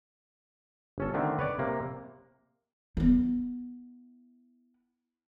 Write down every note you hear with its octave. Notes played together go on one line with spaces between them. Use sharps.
G1 C#4 A4
D3 D#3 A3 C4
B4 C#5 D5
C3 A#3
B3 E4